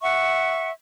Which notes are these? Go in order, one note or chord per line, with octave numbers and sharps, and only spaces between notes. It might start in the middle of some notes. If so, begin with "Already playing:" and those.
E5 F#5 C#6